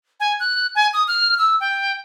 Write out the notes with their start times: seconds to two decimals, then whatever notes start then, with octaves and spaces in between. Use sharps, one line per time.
0.20 G#5
0.40 F#6
0.75 G#5
0.93 D#6
1.08 F6
1.38 E6
1.60 G5